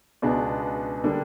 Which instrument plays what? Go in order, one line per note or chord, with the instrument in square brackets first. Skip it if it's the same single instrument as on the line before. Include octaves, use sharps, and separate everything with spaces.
[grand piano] C#2 B2 G#3 B3 D4
D3 G3 A#3 D4